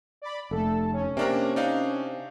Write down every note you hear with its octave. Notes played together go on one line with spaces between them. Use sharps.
D5 B5
F1 A3 A4
C#4
C3 A#3 D4 A#4
D4 D#4 F5